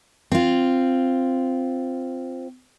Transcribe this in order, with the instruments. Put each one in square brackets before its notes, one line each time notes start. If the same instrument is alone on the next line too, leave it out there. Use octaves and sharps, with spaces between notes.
[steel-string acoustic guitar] C4 F4